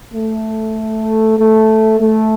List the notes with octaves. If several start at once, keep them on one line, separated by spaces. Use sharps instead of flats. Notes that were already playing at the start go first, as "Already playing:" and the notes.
A3
A3
A3